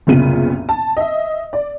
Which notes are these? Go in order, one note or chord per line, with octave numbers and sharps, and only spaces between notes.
F#1 C2 A#2 C#3 B3 D#7
A5
D#5 E5
D5